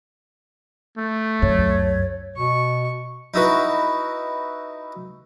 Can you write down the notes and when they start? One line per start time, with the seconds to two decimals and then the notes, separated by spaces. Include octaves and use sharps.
0.98 A3
1.42 C#2 F#2 C#5
2.36 B2 C#6
3.34 D#4 E4 F#4 B4